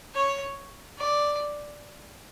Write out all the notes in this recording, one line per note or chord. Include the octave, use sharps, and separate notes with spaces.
C#5
D5